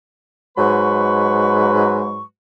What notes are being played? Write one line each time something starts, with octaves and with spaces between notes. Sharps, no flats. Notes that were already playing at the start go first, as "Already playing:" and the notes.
G#2 F#3 G#3 B4 B5 C#6